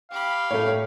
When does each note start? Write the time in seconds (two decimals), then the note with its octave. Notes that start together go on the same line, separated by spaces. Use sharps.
0.11 G4 F5 B5
0.51 A2 A3 A4 C#5 A5